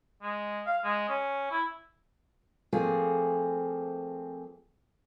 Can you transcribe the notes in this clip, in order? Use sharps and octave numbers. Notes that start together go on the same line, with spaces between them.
G#3
F5
G#3
C#4
E4
F3 A3 A#3 C4 G#4